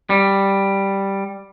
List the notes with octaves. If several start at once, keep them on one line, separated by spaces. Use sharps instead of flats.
G3